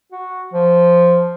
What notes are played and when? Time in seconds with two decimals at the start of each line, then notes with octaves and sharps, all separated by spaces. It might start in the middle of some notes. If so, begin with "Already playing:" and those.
0.12 F#4
0.54 F3